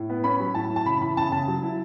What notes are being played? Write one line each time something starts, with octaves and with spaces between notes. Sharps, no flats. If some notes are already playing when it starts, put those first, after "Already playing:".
Already playing: A2
B3
C#4 B5
F#3
A2 A5
A2
A5
C#3 B5
E3 B5
C#3 A5
C#3 A5
F#3
E4